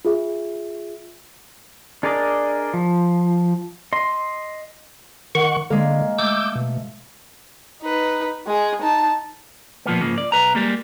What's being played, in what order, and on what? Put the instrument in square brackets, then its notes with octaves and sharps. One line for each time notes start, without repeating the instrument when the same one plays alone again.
[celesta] F4 G#4 E5
[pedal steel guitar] D4 G#4 A#4 D5 D#5
F3
D#5 C6
[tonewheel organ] D#3 F#5 C#6
[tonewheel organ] D3 [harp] G#3 A#3
[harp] A3 [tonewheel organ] D6 E6 G6
[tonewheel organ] B2
[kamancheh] D#4 B4
G#3 G#4
D#4 A5
[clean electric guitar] A#2 F3 A#3 B3
G#2 C#3 F3 A#3
D5
B1 B4 A#5
G3 G#3 A#3